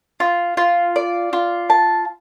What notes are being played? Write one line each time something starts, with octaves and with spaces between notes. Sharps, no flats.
F4
F4
D5
F4
A5